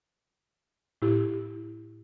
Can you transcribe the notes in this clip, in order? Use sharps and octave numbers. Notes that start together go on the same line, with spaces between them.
A2 E4 G4